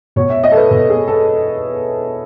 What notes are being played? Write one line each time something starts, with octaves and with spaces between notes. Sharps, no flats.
B2 C#5
E5
D#5
A4
B4
B2 A4
G#4
A4